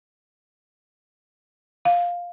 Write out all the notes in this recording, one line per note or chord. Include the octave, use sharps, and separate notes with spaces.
F5